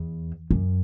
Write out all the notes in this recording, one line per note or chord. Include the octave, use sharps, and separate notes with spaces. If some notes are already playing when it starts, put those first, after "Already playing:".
Already playing: E2
F#2